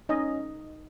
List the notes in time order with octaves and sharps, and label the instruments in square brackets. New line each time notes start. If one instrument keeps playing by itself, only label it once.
[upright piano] C#4 [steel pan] D#4 D#5